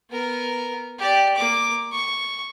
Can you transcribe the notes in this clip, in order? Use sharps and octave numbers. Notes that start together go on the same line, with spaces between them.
B3 A#4
G4 D5
A#3 D6
C#6